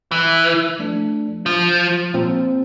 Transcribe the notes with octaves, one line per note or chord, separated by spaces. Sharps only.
E3
F3 A3 D4
F3
A#2 F3 C4